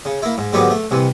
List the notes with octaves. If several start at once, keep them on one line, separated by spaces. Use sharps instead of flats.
C#3
A#3 E4
G#2
G#2 D3 D#3 F#3 B3 G4
A3
C2 C3 E3